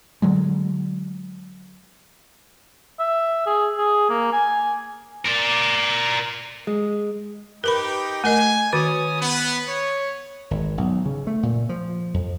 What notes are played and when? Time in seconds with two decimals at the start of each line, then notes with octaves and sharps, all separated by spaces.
0.22 D3 F#3 G#3
2.99 E5
3.46 G#4
3.78 G#4
4.09 A#3
4.32 G#5
5.25 A#4 D5
6.67 G#3
7.64 D#4 G4 A#4 B4 G5 B5
8.24 A3 A#4 D#5 G#5
8.72 D#3 C#4 F#4 D6 D#6
9.21 B3
9.67 C#5
10.51 G#1
10.78 B1
11.06 C#3
11.27 A3
11.43 A#2
11.69 F3
12.14 F2